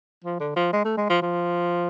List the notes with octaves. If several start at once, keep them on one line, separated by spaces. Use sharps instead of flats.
F3
D3
F3
G#3
A3
G#3
F3
F3